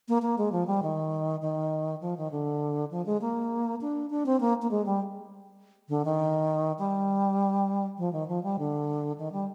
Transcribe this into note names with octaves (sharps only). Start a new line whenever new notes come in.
A#3
A#3
G#3
F3
G3
D#3
D#3
F3
D#3
D3
F3
G#3
A#3
D4
D4
C4
A#3
A#3
G#3
G3
D3
D#3
G3
F3
D#3
F3
G3
D3
D#3
G3